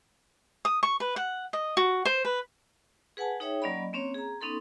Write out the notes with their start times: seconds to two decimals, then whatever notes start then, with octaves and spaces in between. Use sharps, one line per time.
0.65 D#6
0.83 C#6
1.00 B4
1.16 F#5
1.53 D#5
1.77 F#4
2.05 C5
2.25 B4
3.17 G#4 B4 F#5 G#5 A5
3.40 D#4 G#4 C#5 E5 G5
3.62 F#3 A#3 C#4 D5 D#5 B5
3.93 A#3 C4 C#4 C#5
4.15 G#4 A#5
4.41 B3 C#4 D#4 A4 C6